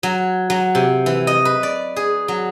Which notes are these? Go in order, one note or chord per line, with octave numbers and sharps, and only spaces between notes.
F#3
F#3
C3
E3
D#5
B4
D5
G#4
F#3